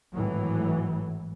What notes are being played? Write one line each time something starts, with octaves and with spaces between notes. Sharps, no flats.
G#1 A2 E3 F#3